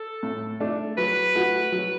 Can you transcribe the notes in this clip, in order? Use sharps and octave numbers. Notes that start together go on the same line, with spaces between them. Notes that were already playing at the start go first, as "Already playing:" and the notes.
Already playing: A4
A2
A3 D4
F#3 B4
A3 F#4
F#3